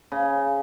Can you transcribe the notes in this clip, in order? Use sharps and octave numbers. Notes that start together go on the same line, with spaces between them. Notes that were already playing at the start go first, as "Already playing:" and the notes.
C#3